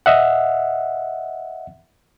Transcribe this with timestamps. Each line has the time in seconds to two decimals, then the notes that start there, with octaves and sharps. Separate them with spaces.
0.06 D#5 E5 F#5